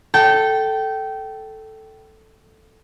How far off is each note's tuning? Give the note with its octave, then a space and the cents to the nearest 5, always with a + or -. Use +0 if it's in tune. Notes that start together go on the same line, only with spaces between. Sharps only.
A4 +0 G5 -20